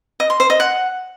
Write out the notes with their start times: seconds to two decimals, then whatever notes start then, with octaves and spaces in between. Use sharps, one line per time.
0.20 D#5
0.30 C6
0.40 C5
0.50 D#5
0.60 F#5